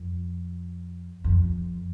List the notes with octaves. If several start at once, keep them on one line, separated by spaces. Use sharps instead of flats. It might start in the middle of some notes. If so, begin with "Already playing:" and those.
Already playing: F2
F2